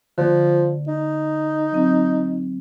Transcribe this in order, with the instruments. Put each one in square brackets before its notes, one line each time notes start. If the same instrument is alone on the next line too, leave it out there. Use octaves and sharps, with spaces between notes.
[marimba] D3 A#3 [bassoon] F3
[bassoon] D#4
[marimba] D3 F#3 C4